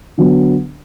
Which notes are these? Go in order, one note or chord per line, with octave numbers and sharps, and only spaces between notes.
D3 F#3 B3